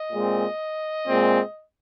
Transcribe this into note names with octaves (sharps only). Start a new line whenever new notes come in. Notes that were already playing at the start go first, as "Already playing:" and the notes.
Already playing: D#5
A#2 G#3 C4
A#2 G#3 C4